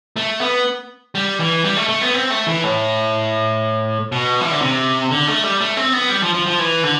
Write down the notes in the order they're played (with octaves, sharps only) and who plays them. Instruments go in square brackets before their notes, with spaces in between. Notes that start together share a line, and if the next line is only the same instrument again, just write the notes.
[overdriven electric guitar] A3
B3
G3
E3
G3
A3
A3
B3
C4
A3
E3
A2
B2
E3
D3
C3
D3
A3
G3
A3
C4
B3
G3
F3
F3
F3
E3
D3